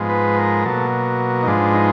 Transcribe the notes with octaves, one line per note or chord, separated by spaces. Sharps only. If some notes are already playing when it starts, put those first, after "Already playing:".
Already playing: G#2 F3 G#3 B3
B4
A#4
B2 F#3 A#3 A4
D#4
G#2 F3 G#3 B3 D4
D#4